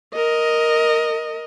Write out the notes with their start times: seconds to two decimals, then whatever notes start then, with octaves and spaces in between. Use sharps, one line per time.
0.14 A#4 D#5